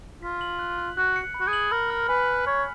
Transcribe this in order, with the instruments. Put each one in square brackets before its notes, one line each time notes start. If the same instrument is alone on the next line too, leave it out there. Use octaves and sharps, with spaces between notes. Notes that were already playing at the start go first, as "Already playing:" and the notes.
[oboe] F4 [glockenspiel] B6
[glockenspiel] F#7
F#6
F#6
[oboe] F#4 [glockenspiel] F#6
[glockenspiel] C#7
B5
[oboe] F#4
G#4
[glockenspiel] F#7
[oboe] A#4 [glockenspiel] B5
[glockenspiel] F6
[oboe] B4 [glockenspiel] G#5
[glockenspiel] B6
[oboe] C#5 [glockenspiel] B6